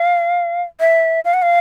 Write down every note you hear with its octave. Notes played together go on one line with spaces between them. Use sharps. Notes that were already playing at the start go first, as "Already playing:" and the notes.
Already playing: F5
E5
F5
F#5
F5